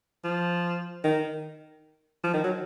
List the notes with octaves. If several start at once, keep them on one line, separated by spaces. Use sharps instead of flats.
F3
D#3
F3
D#3
F#3